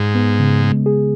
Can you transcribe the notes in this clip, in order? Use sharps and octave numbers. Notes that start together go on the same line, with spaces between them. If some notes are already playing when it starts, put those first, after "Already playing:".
Already playing: G#2
B3
C#3
G#3
G#4